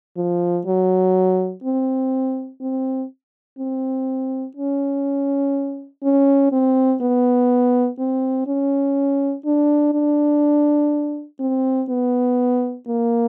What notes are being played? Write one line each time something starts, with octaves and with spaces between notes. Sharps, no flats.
F3
F#3
C4
C4
C4
C#4
C#4
C4
B3
C4
C#4
D4
D4
C4
B3
A#3